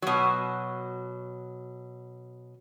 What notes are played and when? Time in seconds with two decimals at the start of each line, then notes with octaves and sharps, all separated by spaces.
0.02 B2 F#3